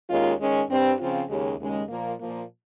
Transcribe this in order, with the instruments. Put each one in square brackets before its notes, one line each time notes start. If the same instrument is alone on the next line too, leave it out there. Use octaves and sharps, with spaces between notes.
[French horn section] D#2 D#3 G#3 C#4 F4
D#3 G#3 C#4
G2 G3 C4
C#3 F3 C4 F4
D#2 C#3 G#3 C#4 G4
D#2 C#3 G#3 C#4
A#2 F3 A#3
A#2 F3 A#3